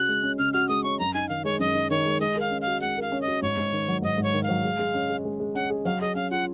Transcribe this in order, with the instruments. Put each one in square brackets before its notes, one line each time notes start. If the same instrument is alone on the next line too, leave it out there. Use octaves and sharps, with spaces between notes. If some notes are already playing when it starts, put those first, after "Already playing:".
Already playing: [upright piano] C#3 F#4 [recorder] F#6
[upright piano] G#3
C#4
[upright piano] C#3 [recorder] F6
[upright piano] F#4 [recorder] F6
[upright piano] G#3 [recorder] D#6
[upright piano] C#4 [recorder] C#6
[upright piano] F#2 [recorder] A#5
[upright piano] D#4 [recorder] G#5
[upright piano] D#3 [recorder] F5
[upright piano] G#3 [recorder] C#5
[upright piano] F#2 [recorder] D#5
[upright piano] D#4
[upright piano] D#3 [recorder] C#5
[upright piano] G#3
[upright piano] G#3 [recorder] D#5
[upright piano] A#4 [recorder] F5
[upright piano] C#4
[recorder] F5
[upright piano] F#4
[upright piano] G#3 [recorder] F#5
[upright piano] A#4 [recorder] F5
[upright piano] C#4
[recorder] D#5
[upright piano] F#4
[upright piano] G#2 [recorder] C#5
[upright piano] G#2
D#3
F#3
[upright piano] G#2 [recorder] D#5
[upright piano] G#2
[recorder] C#5
[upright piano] D#3
[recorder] F5
[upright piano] F#3
G#3
G#3
C#4
G#4
G#3
G#3
[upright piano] C#4 [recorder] F#5
[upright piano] G#4
[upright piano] F#3 [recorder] F5
[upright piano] G#4 [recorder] D#5
[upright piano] C#4 [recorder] F5
[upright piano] F4 [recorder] F#5